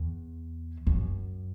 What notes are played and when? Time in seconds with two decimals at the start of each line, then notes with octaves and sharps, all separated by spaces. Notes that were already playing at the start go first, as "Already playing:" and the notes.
Already playing: E2
0.87 F#2